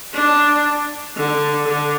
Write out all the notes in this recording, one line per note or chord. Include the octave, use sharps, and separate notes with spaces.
D4
D3
D3